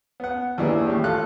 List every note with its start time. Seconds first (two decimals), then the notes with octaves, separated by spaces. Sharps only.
0.20 B3 F#5
0.58 D#2 E3 D4 G#4
0.87 A2 G3 G4
1.04 F4 A4 F#6